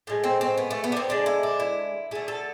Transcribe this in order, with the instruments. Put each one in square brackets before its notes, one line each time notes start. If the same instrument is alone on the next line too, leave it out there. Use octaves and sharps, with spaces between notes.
[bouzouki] A2 G#3
C4
C4
B3
A3
B3
D4
C4
D3 G#3 D4
E4
D4
E4
D3 A3 G#4
A4